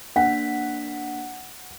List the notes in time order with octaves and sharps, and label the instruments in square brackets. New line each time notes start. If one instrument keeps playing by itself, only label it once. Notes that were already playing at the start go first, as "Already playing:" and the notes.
[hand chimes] A#3 D4 B6 [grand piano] F#5